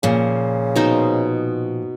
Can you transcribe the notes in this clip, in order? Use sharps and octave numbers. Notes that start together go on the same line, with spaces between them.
A#2 C#3 F3
B2 D#4 C5